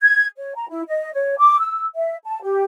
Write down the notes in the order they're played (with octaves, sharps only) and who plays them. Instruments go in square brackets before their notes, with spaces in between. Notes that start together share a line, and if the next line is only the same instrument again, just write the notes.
[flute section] G#6
C#5
A#5
E4
D#5
C#5
D6
E6
E5
A5
G4